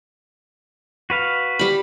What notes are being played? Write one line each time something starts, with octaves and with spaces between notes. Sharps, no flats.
F#4 B4 F5
G3 B5